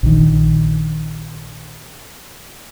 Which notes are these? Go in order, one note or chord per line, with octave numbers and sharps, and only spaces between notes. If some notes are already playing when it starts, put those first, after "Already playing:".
A#1 D#3